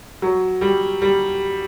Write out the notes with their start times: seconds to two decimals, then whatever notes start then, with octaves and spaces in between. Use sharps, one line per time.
0.22 F#3
0.61 G3
1.02 G3